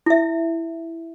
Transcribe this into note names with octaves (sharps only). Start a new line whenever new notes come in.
E4 E5